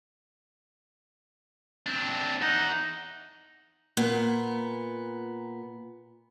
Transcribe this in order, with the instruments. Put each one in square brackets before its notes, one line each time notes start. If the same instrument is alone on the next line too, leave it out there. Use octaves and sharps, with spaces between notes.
[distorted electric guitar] C4 D4
[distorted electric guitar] E2 F#5 [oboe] D#4
[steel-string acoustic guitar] A#2 B3